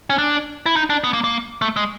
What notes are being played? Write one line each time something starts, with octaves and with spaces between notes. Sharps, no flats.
C#4
D4
E4
D#4
D4
B3
A#3
A#3
A3
G#3